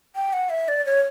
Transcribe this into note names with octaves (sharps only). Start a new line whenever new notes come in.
G5
F#5
E5
D5
C#5